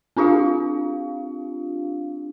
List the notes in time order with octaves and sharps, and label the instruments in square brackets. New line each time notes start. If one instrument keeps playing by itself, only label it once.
[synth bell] C4 D4 F4 G4 F5